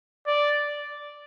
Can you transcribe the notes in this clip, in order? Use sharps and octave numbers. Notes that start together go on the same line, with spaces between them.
D5